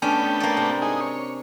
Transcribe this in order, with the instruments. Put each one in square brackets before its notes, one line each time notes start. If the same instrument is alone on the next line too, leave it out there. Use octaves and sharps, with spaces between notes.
[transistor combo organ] A3 B3 G5 [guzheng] C#4 D4
[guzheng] A#3 D5
C3
[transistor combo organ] D#4 G#4
C#5